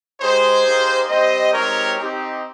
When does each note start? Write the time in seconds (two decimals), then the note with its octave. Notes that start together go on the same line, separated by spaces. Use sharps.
0.20 G#3 D#4 G4 G#4 C5
0.65 A#3 D#4 G4
1.09 G3 C4 G4 C5 D#5
1.53 G#3 C4 D#4 G4 A#4 C#5
1.99 C4 D#4 G4